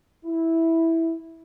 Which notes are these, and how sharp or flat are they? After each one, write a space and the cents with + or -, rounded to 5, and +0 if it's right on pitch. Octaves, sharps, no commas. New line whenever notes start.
E4 -5